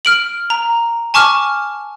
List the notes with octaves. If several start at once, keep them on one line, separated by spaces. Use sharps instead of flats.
F6 D7 F#7
A#5
G#5 A5 C#6 D6 F6